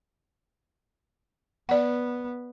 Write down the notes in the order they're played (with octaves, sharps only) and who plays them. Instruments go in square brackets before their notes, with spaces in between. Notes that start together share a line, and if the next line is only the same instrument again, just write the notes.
[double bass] B3 [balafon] D5 F#5